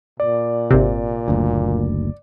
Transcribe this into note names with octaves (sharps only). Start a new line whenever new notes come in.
A#2 D5
G#1 C3
F#1 D2